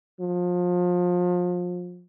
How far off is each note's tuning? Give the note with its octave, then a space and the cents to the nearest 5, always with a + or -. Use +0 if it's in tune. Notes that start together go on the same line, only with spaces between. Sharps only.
F3 +30